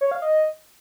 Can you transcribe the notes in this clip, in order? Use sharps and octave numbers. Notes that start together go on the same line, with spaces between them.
C#5
F5
D#5